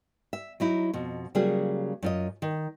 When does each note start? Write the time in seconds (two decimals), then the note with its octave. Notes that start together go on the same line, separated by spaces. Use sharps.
0.33 E5
0.60 F#3 D#4 E4
0.93 F2 B2
1.35 C#3 F#3 G3 A#3 F#4 G#4
2.02 F#2 F4 D#5
2.42 D#3